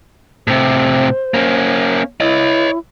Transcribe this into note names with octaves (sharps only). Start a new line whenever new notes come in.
A2 C3 C5
A#3 C#4
E4 C#5 D#5